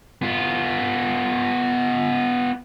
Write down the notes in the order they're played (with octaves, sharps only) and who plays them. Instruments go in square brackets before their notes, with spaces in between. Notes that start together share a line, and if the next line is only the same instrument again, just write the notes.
[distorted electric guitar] B3 F4